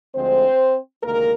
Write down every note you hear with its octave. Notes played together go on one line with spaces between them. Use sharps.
D2 D3 F3 G#3 C4 C5
D2 C3 D#3 G#3 A#3 A#4